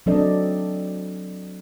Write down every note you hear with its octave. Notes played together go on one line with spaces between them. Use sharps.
F#3 C4 D4 A4 D5 D#5